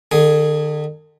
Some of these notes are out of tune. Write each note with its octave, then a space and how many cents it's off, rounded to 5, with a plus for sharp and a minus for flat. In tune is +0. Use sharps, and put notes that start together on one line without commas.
D3 +45 G#4 +5